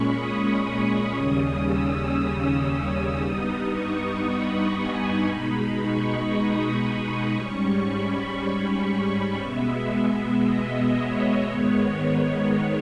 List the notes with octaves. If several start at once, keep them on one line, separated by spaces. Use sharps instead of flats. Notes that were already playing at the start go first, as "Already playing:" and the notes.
Already playing: A#2 G#3 C#4 B5 C#6
D#6
D#6
D#2 C#3 G3 C#4
E6
E6
D#6
G2 G3 B3 D#4 D#6
C#6
B5
G#5
B2 G#3 D#4 B5
C#6
D#6
B5
G#2 G3 C#4 C#6
B5
B2 G#3 B3 E5
D#5
C#5
G#2 D#3 G#3 B3 C#5
C#5